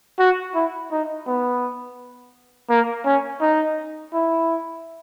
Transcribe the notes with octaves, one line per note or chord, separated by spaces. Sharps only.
F#4
E4
D#4
B3
A#3
C#4
D#4
E4